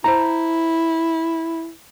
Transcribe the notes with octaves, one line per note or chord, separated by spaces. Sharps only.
E4 C5 A5 A#5